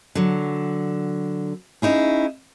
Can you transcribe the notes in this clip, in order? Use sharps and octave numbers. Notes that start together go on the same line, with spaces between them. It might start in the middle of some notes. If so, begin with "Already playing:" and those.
D3 F#3
C#4 D#4 E4 G#4